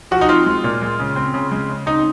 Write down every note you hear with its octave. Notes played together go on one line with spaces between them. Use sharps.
F3 F#4
D#4
C4 F4
G#3
A#2
G#3
C#3
C4
C#3
G#3
C#3
C4 D#4